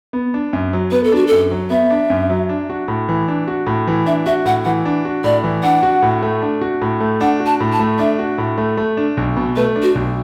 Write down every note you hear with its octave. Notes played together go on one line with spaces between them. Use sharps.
B3
D4
F#2
F#3
B3 B4
A4
D4 F#4
F#2 A4
F#3
B3 E5
D4
F#2
F#3
D4
F#4
A2
E3
D4
F#4
A2
E3
D4 E5
F#4 E5
A2 F#5
E3 F#5
D4
F#4
A2 D5
E3
D4 F#5
F#4
A2
A3
D4
F#4
A2
A3
D4 F#5
F#4
A5
A2
A5
A3
D4 E5
F#4
A2
A3
A3
D4
B1
B2
A3 B4
D4
F#4
B1